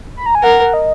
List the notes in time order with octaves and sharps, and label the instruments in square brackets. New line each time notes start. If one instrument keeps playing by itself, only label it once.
[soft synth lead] B5
A#5
G#5
[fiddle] A#4 [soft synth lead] F#5
[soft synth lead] D#5